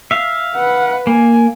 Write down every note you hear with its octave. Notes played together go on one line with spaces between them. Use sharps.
E5 F5
B4 F#5
A#3 G#5